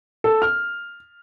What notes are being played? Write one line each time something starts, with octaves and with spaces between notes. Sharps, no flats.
A4
F6